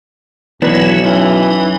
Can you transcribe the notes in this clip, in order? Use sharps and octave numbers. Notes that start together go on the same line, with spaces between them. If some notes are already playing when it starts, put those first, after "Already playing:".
B1 E3 F#3 B3 D4 E4
F#2 E3 D#4